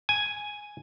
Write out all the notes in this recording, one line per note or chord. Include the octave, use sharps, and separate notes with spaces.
G#5